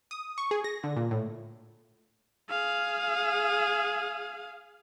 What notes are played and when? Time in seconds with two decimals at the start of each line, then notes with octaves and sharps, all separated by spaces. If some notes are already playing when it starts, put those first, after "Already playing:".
0.11 D#6
0.38 C#6
0.51 G#4
0.64 A#6
0.84 D3
0.96 A#2
1.11 A2
2.50 G#4 F5